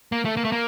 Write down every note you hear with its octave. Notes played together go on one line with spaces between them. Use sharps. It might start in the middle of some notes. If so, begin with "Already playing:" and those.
A#3
A3
A#3
A3
A#3